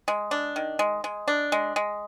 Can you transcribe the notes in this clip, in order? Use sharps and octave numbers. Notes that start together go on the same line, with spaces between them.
G#3
D4
D#3
G#3
G#3
D4
G#3
G#3